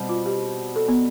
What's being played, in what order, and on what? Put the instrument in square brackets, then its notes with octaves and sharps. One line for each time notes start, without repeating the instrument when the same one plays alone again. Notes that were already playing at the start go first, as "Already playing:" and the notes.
Already playing: [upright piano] B2 G3 C4
[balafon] F4
G4
A4
B3